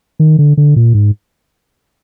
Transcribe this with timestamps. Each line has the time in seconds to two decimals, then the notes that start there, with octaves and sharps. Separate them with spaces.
0.19 D#3
0.38 D3
0.57 D3
0.76 A#2
0.94 G#2